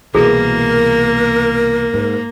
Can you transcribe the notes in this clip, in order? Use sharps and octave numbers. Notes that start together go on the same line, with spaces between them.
C2 B2 E3 A#3 E4 F#4 G#4 A#4
G#2